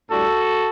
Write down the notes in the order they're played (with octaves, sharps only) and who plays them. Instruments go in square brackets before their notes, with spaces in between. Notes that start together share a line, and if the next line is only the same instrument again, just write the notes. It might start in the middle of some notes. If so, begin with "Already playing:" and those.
[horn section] A2 G3 D4 F#4 A4